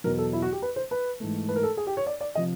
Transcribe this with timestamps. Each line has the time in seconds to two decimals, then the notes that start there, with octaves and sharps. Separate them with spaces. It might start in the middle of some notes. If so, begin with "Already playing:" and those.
0.04 E2 B2 F#3 A#4
0.18 A4
0.33 E4
0.42 F#4
0.53 G4
0.62 B4
0.76 C5
0.91 B4
1.20 G#2 E3 A3
1.49 B4
1.56 A#4
1.63 A4
1.77 G#4
1.87 G4
1.97 C#5
2.06 D5
2.21 D5
2.35 C3 F3 D#5